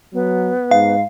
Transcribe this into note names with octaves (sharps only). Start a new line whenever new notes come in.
F#3 B3
G#2 F5